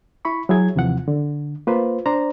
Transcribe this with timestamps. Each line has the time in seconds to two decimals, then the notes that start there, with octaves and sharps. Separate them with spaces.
0.25 E4 B5 C#6
0.49 F#3 E4 G#4 G#6
0.76 D#2 C3 E3 F3 F#5
1.08 D3
1.67 A#3 F4 B4 C5
2.06 D4 C5 D5 A#5